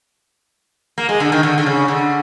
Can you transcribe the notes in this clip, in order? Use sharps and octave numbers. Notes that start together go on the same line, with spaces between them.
A#3
G#3
D3
D#3
D3
D3
C#3
D3